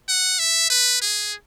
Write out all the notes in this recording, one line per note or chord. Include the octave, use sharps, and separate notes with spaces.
F#5
E5
B4
G#4